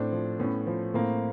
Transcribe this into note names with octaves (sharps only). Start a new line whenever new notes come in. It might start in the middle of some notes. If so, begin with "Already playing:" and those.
Already playing: A2 C4 D4
F3
A2 B3 C#4
F3
A2 A#3 C4